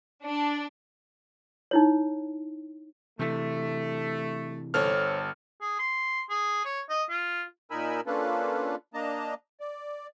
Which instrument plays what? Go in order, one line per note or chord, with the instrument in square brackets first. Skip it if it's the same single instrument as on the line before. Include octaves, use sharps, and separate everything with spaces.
[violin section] D4
[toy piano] D#4 E4 C#5
[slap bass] C3 E3 [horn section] A3
[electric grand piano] G1 A4 F6 [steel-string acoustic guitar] C5 C#5
[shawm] G#4
C6
G#4
C#5
D#5
F4
[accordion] A#2 D#4 A#4 G#5 B5 E6
A#3 C#4 D4 F4 A4 B4
A#3 D4 D#5 A5 A#5
D5